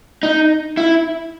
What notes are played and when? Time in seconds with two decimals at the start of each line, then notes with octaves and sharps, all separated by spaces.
0.23 D#4
0.77 E4